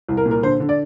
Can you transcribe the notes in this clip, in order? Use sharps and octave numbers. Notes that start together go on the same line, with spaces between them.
C2
A#4
A#2
A#4
D3 C5
D3
D5